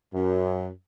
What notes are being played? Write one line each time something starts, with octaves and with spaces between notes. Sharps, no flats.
F#2